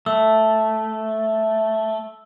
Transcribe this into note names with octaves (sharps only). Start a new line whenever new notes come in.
A3 E6